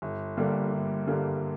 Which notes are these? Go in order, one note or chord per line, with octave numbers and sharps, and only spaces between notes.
G1
G2 D3 G3 A#3
G1
G2 D3 G3 A#3